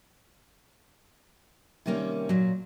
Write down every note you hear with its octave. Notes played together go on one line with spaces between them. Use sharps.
C3 D#3 G3 A#3 C#4
A#2 F#3